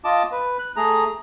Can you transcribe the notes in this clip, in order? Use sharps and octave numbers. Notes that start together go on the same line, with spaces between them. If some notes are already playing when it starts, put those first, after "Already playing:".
F4 D#5 A5 D6
B4
F#6
A3 G#4 A#5